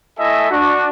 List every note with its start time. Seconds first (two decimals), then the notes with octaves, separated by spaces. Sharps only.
0.18 A3 E4 A4 D#5 E5 G#5
0.50 D4 F#4